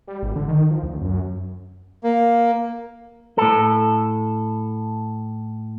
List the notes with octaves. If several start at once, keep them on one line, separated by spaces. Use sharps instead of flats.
G3
G#1
D3
D#3
F3
D2
F#2
A#3
A2 A4